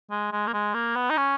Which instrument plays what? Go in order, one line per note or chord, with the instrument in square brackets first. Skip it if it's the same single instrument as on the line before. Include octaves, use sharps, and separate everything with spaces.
[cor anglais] G#3
G#3
A#3
G#3
A#3
B3
D#4
C#4